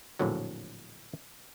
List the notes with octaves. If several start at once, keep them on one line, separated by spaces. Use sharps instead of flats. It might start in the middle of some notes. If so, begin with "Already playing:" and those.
A#1 F2 A2 D3 F#3